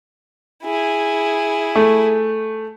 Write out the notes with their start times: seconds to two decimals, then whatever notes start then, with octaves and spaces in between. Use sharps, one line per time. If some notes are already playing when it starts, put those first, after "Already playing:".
0.63 E4 G#4
1.76 A3